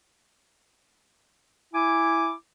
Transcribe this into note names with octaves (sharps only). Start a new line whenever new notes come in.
E4 G#5 D6